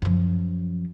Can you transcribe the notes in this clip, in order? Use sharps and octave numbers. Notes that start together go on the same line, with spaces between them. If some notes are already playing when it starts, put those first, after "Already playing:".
F#2 F3